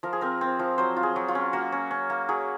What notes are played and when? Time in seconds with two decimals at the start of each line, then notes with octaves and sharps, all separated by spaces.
0.03 F3 A#4
0.13 G#4
0.21 C4 A#4
0.41 C4
0.59 F3
0.78 F#3 C5
0.96 F4
1.03 G#4
1.16 F#3
1.28 F4
1.35 C#4
1.53 A#3 F#4
1.72 C#4
1.91 C#4
2.10 A#3
2.29 F#3 G#4